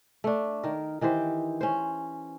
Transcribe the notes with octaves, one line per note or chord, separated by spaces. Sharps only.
A3 D4
D#3 A#4
D#3 E3 G4 C5
C#4 C5